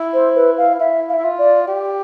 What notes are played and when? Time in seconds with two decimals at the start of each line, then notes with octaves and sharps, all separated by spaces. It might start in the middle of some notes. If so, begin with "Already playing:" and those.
Already playing: E4
0.14 C5
0.36 B4
0.58 F5
0.80 E4 E5
1.09 F5
1.13 E5
1.19 E4
1.24 F4
1.39 D5
1.68 G4